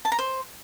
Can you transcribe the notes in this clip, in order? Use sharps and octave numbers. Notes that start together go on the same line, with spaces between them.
A5
A#5
C5